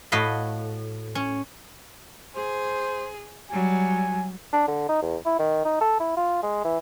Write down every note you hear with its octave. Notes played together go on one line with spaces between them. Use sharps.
A2 F#4 D#5 F5 B5
C#4
G#4 C5
F#3 G3 G#5
D4
D3
D#4
E2
E4
D#3
D#4
A4
E4
F4
G#3
E3